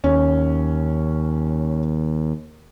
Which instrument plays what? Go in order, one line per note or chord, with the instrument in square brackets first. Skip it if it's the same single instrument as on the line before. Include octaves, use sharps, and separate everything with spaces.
[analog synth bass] D#2 [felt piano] C#4